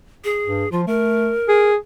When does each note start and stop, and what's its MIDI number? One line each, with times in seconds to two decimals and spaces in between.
0.24 0.71 68
0.46 0.65 43
0.72 0.86 53
0.72 0.81 65
0.87 1.33 57
0.87 1.70 70
1.49 1.76 68